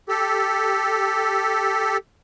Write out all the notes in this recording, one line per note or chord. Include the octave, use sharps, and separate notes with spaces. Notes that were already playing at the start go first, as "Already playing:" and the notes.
G4 A4